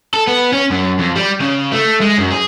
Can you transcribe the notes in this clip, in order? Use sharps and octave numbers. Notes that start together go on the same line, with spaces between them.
A4
B3
C#4
F#2
F2
G3
C#3
A3
G#3
F#2
G#4